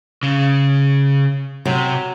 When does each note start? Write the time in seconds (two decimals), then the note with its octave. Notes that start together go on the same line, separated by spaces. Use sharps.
0.23 C#3
1.65 C3 F#3